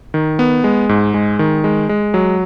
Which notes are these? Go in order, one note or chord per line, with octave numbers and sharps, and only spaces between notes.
D#3
B3
G#3
G#2
G#3
D#3
G#3
G#3
F#3